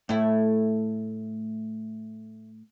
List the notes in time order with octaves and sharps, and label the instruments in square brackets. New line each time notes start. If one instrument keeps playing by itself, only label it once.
[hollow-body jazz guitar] A2 [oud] A3 E4